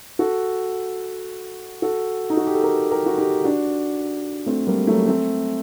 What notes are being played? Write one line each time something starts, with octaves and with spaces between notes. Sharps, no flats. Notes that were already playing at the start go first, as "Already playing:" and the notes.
F#4 A4
F#4 A4
D#4
F#4
G4
A4
G4 A#4
G4 A#4
F#4
D#4 G4
D4 F#4
A3 C4
G3 A#3
F#3 A3
A3 C4